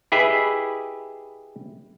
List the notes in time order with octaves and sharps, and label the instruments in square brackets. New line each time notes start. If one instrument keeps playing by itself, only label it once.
[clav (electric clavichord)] E4 G4 G#4 B4 D#5 E5